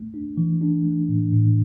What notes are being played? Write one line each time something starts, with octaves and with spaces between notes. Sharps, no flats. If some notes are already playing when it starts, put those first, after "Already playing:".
Already playing: A3
D4
E3
D4
A3
A2
A2